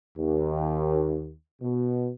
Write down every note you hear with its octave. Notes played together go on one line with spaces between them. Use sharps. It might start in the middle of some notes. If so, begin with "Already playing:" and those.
D#2
B2